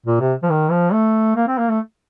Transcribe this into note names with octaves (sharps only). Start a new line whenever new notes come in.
A#2
C3
F3
D#3
F3
A3
A#3
C4
A#3
A3